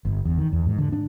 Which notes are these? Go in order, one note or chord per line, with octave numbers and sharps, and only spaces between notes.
G1
E2
D#3
E2
G#2
D3
D4